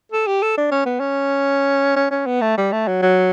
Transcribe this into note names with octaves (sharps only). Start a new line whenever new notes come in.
A4
G4
A4
D4
C#4
B3
C#4
C#4
C#4
B3
A3
G3
A3
F#3
F#3